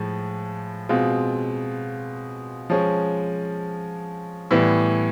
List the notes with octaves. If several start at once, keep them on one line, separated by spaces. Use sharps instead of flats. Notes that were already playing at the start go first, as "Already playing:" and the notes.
Already playing: A2 F3 G#3
B2 G#3 C4 F4
F3 G#3 C#4
A2 E3 G3 B3 E4